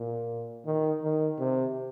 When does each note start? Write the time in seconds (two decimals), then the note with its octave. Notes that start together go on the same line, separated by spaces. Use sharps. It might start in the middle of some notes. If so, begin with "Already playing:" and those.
Already playing: A#2
0.65 D#3
1.02 D#3
1.39 C3